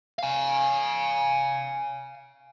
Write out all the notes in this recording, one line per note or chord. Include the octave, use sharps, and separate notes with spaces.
F5 G#5